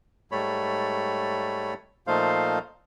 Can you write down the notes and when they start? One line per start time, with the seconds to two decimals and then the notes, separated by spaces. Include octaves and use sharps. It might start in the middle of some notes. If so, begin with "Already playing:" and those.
0.31 G#2 G3 A3 C#5 B5
2.07 A#2 F3 A3 D#4 C5 F5